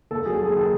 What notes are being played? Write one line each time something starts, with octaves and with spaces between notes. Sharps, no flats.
D#2 A4
F#3 G#4
D#2 G#4
D#3 A4